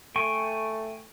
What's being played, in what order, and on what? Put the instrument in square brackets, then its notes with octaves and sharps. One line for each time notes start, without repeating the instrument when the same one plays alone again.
[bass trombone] A3 [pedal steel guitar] G5 G#5 C#6